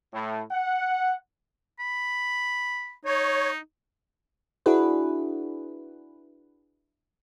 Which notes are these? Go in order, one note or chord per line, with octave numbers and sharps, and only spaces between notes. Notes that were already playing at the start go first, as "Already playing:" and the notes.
A2
F#5
B5
D#4 C#5
D4 E4 F#4 G#4 B4